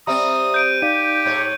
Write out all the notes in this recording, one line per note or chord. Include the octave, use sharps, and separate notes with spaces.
G3 C4 E5 A#5 D#6
G6 D7 D#7
D#4 G4 D5 F5 D#7
G#2 C#5